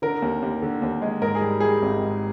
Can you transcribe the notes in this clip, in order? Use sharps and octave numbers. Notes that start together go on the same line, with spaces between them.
D3 A#4
D#2
D#2
D3
D#2
G#3
G#2 A#4
G#4
G3
G3 G#4
G#1
G#2